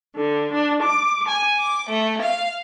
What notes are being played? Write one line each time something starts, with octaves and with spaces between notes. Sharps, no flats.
D3
D4
D6
G#5
D6
A3
F5